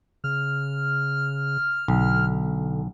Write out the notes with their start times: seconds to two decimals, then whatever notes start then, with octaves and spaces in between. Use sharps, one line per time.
0.24 C#3 F6
1.88 B1 D3